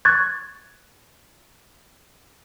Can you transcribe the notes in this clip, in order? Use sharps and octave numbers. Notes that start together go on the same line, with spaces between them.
C#6 F#6 G#6 A6